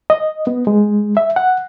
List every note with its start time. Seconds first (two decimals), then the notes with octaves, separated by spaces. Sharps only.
0.10 D#5
0.47 B3
0.67 G#3
1.17 E5
1.36 F#5